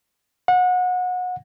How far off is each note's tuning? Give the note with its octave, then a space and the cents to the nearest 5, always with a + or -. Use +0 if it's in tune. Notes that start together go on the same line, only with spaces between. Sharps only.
F#5 -25